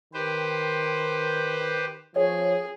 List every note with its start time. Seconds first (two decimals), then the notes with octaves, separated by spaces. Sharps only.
0.14 D#3 G4 B4 C5
2.16 F3 G#4 C#5